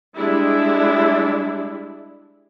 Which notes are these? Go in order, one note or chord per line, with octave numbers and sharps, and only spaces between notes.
G3 G#3 D4 E4